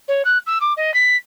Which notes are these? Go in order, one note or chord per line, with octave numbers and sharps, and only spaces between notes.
C#5
F#6
E6
D6
D#5
B6